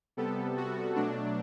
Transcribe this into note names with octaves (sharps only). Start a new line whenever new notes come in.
C3 G3 B3 A4
F#4
B2 F#3 A3 D4